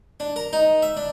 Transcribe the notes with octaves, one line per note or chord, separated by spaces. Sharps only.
D4
A#4
D#4
E5
D4